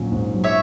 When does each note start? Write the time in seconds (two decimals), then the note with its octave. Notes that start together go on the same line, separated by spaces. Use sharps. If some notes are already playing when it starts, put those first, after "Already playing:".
Already playing: A#1 F#3 C#4
0.12 G#2
0.34 F#3
0.44 C#5 E5